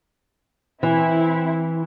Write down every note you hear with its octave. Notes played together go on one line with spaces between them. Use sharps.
E3 C4 E4